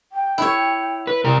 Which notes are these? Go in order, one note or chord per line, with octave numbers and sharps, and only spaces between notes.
G5
E4 C#5
B4
C3 A#4